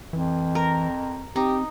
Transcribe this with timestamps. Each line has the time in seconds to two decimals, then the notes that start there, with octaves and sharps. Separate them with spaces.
0.13 F2 E3
0.55 A#4
1.36 C4 D#4 G4